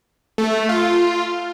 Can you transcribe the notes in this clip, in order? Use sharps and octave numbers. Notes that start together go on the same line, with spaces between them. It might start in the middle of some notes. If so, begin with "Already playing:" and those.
A3
F4